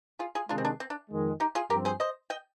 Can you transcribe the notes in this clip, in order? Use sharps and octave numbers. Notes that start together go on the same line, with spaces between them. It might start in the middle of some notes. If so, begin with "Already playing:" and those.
F4 G#4
F4 G#4
C3 D#3 G#3 D4 F4
C4
D4
C4
D4
F2 D#3 G#3
D#4 G4
F4 G#4
G2 F3 C4 G4 A#4
G#4 C5
C5 D#5
D#5 G5